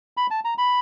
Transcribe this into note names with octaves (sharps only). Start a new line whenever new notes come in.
B5
A5
A#5
B5